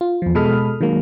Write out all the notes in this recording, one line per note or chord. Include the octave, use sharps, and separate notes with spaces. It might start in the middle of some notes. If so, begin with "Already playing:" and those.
F4
E2 F3
B2 G#3 A4 B5 D#6 F6
D#3 F#3 G#3 A#3